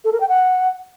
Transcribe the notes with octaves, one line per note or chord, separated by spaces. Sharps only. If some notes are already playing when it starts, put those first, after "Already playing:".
A4
A#4
G5
F#5